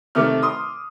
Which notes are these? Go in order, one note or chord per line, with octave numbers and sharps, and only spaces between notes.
C3 D#3 A3 D6 F6
C6 D#6